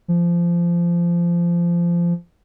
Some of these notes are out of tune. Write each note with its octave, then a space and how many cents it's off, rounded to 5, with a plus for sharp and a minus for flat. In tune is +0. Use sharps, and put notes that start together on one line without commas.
F3 -20